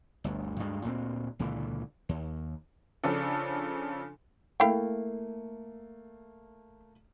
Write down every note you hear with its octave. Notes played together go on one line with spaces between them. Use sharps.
G1 D2
D2 G2 G3 G#3
D2 A#2 F#3 C4
C#2 A#2 D3 E3
D#2
C#3 F3 D4 A4
A3 A#3 E4 F5 G5